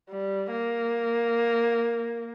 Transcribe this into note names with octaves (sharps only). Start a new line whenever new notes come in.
G3
A#3